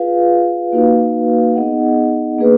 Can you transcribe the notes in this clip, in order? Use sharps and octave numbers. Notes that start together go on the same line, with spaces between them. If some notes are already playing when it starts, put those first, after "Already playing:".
Already playing: F4 G#4 B4 F5
A#3 D#4 F#4 B4 F5
B3 D#4 G#4 D#5 F#5
A#3 D4 G#4 B4